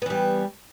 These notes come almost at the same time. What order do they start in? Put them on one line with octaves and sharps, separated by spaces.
B3 E3 G3